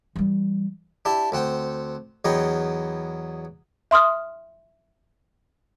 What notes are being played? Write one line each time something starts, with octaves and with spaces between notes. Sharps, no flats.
E3 G3
D4 E4 G4 A5
D2 C4 F#5 G5
E2 F#3 B3 D#5 G5
E5 C6 D#6 F6